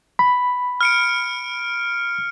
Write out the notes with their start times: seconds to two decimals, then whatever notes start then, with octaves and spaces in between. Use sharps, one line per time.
0.19 B5
0.81 F6 C#7 D7